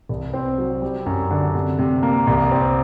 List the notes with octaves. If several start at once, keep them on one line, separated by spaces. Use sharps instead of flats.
C2
C4
F#3
G3
F#2
D3
C3
C3
A#3
C2
C4